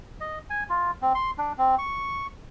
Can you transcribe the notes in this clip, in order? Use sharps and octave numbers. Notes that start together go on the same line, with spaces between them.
D#5
G#5
F4
C4
C6
D4
C4
C#6